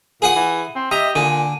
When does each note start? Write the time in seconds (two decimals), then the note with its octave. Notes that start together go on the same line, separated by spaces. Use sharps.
0.22 A#2 G#4 F#5 D#6
0.36 E3
0.76 C4
0.91 G4 D#5 E5 A#5
1.16 A#2 D3 G#5